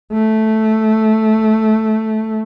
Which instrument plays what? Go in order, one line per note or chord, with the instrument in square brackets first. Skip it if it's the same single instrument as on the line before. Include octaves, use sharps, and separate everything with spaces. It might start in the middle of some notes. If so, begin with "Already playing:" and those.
[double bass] A3